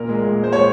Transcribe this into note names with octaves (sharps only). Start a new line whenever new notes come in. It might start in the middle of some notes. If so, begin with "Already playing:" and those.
Already playing: A#2 A#4
G#3
A#2
G#3
C5
A#2 C#5